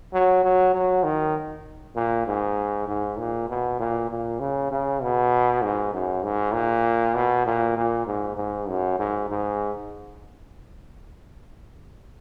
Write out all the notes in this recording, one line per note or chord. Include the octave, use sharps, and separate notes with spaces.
F#3
F#3
F#3
D#3
A#2
G#2
G#2
A#2
B2
A#2
A#2
C#3
C#3
B2
G#2
F#2
G#2
A#2
B2
A#2
A#2
G#2
G#2
F#2
G#2
G#2